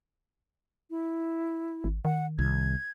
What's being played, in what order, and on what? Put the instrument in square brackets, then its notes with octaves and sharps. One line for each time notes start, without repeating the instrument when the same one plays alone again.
[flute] E4
[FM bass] G#1
[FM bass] D#3 [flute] F#5
[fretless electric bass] C2 [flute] G#6